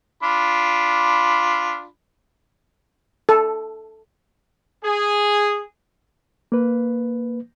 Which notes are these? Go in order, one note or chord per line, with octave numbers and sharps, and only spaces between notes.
D4 F4 B5
A4
G#4
A#3 B4